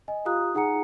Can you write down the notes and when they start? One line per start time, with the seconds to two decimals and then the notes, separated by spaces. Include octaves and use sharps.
0.08 D#5 G#5
0.25 F4 G4 F5 A#5 D#6 F#6
0.55 D#4 G#4 F#5 G#5 A#5 C#7